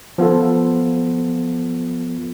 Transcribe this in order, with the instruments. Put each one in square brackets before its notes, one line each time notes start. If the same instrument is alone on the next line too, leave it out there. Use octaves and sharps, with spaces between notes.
[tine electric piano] F3 B3 F4 A4